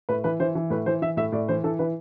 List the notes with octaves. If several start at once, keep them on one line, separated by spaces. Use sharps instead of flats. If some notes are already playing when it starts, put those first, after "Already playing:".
A2 B4
E3 B4
E3 C5
E3
A2 B4
E3 C5
E3 E5
A2 E5
A2 D5
E3 C5
E3 A4
E3 B4